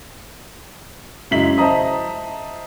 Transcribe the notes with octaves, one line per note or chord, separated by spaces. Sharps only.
F#2 C#3 G#3 E4 B6 F#7
C5 D#5 E5 A5 A#5 D#6